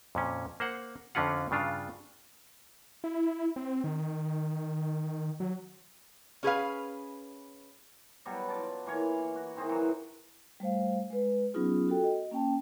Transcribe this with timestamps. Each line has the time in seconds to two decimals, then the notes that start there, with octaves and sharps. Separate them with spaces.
0.15 F2 A#2 C#4
0.60 A#3 C5 F#5
1.15 F2 D3 C#4 F4 F#5
1.51 G2 C#3 D4 F4
3.04 E4
3.56 C4
3.84 D#3
5.40 F#3
6.43 C#4 G#4 B4 F5
8.26 B2 F#3 G3
8.48 F4 D5 A5
8.86 E3 A#3 C#5
9.36 F#4
9.56 D#3 E3 C4 G#4
9.69 E3 F#3
10.60 G3 A3 C5 F5
11.10 G#3 B4
11.54 F#3 B3 C#4 D#4 F4 G#4
11.89 F#4 A4 G5
12.04 D#5
12.31 A#3 C#4 G5 A5